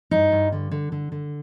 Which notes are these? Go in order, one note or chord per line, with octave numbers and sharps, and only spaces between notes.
G2 D#4
G2
D3
D3
D3
D3